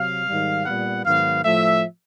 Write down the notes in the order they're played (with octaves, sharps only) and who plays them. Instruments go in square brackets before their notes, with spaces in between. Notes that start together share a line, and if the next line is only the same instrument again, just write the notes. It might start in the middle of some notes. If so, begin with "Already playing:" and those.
Already playing: [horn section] C3 F#3 F5
G#2 D#3 G3
A#2 G3 B3 F#5
G#2 D#3 F#3 B3 F5
A2 F3 A3 E5